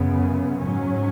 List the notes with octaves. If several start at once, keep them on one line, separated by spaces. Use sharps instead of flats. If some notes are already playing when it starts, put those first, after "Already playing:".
Already playing: F#2 C#3 B3
G#2 F#3 C#4